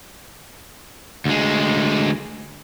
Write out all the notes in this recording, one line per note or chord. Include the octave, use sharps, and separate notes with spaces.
D2 G#3